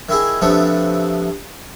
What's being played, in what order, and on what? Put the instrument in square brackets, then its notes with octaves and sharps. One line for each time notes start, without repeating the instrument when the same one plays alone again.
[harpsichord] D#3 E4 G#4
C3 F3 A3 B3 D4